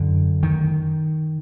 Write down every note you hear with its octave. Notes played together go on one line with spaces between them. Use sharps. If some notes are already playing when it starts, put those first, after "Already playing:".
Already playing: F#2 D3
D#3